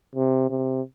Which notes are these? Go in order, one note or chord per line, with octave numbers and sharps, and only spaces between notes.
C3
C3